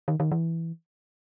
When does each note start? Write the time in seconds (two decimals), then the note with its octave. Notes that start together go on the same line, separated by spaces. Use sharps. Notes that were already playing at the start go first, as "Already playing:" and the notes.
0.08 D#3
0.20 D#3
0.31 E3